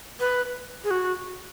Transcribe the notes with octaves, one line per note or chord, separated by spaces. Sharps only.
B4
G#4
F#4